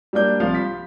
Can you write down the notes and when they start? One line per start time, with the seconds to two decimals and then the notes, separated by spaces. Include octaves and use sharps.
0.13 G3 A#3 D4 G6
0.40 C2 F3 F5
0.55 B6